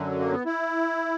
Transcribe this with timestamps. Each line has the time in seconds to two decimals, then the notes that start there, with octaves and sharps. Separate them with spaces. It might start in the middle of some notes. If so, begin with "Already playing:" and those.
Already playing: F#2 D3 F#3
0.20 A#3
0.32 B3
0.46 E4